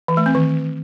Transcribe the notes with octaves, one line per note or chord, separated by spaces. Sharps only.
E3
A3
C4
D#3